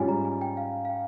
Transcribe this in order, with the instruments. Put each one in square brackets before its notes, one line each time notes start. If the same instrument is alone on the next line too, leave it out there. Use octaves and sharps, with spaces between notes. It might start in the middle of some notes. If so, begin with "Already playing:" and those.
Already playing: [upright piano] G#2 G3 C#4 F4 [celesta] G#5
[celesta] A#5
G#5
G5
F5
F5
G5